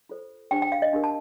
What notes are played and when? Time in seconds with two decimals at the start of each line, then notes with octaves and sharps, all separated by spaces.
0.09 F4 A4 C5
0.51 D4 G4 C5 G5
0.62 G5
0.72 F5
0.82 D#5
0.93 D4 G4 A#4
1.04 A5